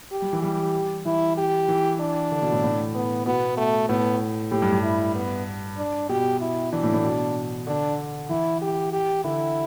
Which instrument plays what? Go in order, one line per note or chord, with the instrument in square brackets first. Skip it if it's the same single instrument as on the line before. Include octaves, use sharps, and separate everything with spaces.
[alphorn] G4
[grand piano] G3
E3
[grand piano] G3 [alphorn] G4
[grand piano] E3 [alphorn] E4
[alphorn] G4
[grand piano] E3
[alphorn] D4
[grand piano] D3
B2
A2
A2
[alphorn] B3
[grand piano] B2 [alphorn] B3
[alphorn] A3
[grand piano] A2 [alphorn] B3
[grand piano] A2 [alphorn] G4
[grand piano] G2
G2
[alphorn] E4
B3
D4
[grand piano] B2 [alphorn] G4
[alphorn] E4
[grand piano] E3 [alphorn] D4
[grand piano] A2
A2
B2
[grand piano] D3 [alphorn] D4
[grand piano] E3 [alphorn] E4
[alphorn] G4
G4
[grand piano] D3 [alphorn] E4